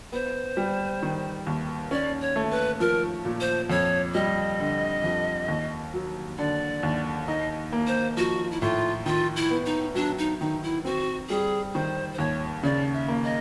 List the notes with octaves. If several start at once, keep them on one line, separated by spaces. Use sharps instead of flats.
B3 C5
G3
D#3
D#2
C#4 D5
C#5
A3
B4
F3 A#4
A#2
C5
F2 C#5
G3 D#5
D3
F2
D#2
F#3
D3 D5
D#2
D#4 D#5
A#3
C5
F3 F#4
E4
A2 F4
D#3 F4
E4
B3
D#4
F#3 D4
D#4
D#3 D#4
E4
C4 F#4
G3 G#4
D#3 C5
C5
D#2 C#5
C#3 D5
E5
A#3
D#5